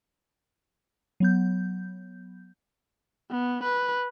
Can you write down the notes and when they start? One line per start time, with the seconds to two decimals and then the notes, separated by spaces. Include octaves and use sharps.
1.20 F#3 B3 G6
3.30 B3
3.63 B4